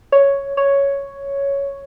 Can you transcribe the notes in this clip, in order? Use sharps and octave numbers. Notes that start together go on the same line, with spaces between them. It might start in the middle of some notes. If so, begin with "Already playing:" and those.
C#5
C#5